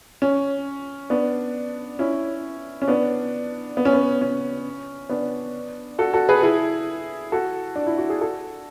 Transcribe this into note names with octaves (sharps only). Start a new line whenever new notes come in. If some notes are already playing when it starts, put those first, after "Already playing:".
C#4
B3 D4
C#4 E4
C#4
B3 D4
B3
C#4
B3
C#4
B3 D4
F#4 A4
F#4 A4
G#4 B4
E4 G#4
F#4 A4
D4
E4
F#4
G#4
F#4 A4